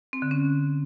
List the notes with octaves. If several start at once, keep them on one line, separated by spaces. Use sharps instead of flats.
C4
D3
C#4